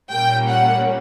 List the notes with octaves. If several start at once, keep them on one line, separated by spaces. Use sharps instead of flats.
A#2 G3 A#3 C#4 G5
F#5